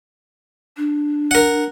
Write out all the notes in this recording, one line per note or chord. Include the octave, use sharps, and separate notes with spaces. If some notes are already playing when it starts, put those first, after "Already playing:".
D4
A#4 F#5